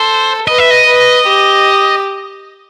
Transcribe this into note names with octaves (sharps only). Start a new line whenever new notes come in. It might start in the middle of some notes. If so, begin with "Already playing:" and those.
Already playing: A4 C5
B4 D#5
E5
D#5
B4
G4